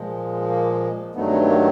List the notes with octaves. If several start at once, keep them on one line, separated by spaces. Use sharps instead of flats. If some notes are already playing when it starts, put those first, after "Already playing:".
Already playing: A#2 F3 G#3
A#3
G2 D#3 F#3 A3 B3
B3
A#3